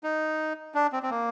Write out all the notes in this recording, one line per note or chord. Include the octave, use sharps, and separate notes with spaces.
D#4
D4
C4
C4
A#3